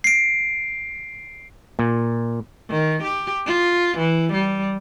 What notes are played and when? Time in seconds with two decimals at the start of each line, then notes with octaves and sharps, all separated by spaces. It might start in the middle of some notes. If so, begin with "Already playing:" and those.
0.04 C7 D7
1.79 A#2
2.70 D#3
3.03 G4
3.46 F4
3.98 E3
4.34 G3